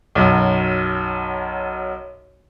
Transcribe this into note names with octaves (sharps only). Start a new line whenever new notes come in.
B1 F#2